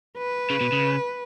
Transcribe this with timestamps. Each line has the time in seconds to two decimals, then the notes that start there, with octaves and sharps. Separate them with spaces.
0.17 B4
0.50 C#3
0.61 B2
0.72 C#3